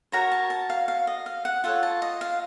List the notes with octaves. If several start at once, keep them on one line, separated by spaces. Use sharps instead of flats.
F#4 A#4 C#5 A#5
A5
A5
F5
F5
D#5
F5
F#5
F4 A4 C#5 F#5
A5
D#5
F5